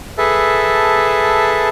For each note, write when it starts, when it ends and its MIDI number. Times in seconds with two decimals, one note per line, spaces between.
0.18 1.69 68
0.18 1.69 69
0.18 1.69 71
0.18 1.69 76
0.18 1.69 81